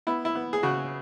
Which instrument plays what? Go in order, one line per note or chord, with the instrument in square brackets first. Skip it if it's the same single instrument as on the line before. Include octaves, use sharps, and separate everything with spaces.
[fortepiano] B3 E4
E4
B3
G#4
C#3 F#4